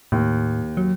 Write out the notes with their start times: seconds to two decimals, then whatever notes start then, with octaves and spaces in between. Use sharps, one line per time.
0.12 D#2 A2
0.77 F#3